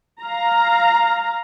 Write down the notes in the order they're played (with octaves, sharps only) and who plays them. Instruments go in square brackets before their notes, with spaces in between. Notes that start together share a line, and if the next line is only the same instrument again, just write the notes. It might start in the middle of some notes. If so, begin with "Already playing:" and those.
[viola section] F5 A#5